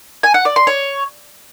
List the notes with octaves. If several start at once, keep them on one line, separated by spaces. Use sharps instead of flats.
G#5
F#5
D5
C6
C#5